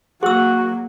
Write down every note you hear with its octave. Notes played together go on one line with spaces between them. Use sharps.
F#3 A#3 F#4 G#4 F#5 E6